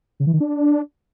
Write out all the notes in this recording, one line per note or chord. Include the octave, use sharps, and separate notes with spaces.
C#3
E3
D#3
D4